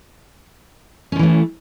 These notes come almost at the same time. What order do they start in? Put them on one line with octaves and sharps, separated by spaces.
C#4 F3 E3 A3